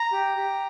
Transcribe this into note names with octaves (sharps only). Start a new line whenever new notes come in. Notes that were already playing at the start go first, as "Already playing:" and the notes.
Already playing: A#5
G4
G4